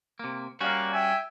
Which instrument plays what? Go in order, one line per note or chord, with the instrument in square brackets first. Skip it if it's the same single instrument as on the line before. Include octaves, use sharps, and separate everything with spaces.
[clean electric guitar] C3 A#3
[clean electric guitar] G3 C#4 F#4 [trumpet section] A#3 D5 F5
[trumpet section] E5 G5 G#5